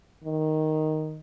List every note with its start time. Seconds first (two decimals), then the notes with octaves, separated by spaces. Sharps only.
0.24 D#3